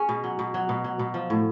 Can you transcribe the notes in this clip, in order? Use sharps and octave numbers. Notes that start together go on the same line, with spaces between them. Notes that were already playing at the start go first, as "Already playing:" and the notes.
Already playing: C#4 G#4
B2
F#3
B2
F#3
B2
F#3
B2
F3
A2